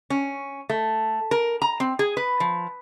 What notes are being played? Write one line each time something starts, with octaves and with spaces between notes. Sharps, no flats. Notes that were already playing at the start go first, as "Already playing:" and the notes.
C#4
A3
A#4
A#5
C4
G#4
B4
F3